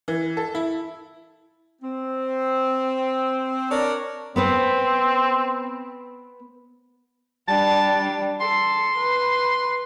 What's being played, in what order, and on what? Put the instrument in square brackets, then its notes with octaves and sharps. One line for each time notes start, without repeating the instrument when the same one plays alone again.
[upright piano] E3
A4
E4
[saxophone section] C4
D4 A#4 C#5 D5
[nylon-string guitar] B3 B4 C5 [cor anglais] C4
[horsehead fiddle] G3 D4 [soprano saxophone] A5
[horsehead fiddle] A4 [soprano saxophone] C6
[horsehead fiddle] B4